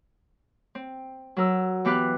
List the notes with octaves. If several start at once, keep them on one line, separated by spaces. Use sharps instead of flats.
C4
F#3 A#4 E6
E3 B3 G4 B4 F5 F#6